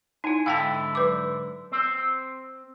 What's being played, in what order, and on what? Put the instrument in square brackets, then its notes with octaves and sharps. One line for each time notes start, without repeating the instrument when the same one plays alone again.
[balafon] D#4 E4 [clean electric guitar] G#5
[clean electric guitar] G#2 D3 E4 [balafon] F5 G5 A5
[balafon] F#3 B4 D6
[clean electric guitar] C4 C5